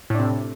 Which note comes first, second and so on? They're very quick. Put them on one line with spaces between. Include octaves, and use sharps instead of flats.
A2 D4 C3